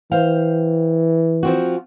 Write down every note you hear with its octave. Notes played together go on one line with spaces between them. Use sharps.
E3 C5 F5 G5
F3 C4 F#4